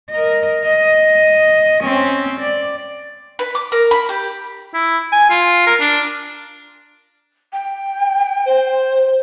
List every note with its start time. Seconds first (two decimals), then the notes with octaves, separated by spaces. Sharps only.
0.10 A#4 D#5
0.64 D#5
1.83 C4 C#4
2.40 D5
3.39 B4
3.55 D6
3.72 A#4
3.91 B5
4.09 G4
4.74 E4
5.12 G#5
5.30 F4
5.67 A#4
5.80 D4
7.53 G5
8.46 C5